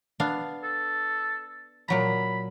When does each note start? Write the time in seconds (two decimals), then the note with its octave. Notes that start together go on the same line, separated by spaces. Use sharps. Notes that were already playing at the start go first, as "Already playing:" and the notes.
0.20 B3 D4 F5
0.63 A4
1.88 A#2 F#3 A#5 B5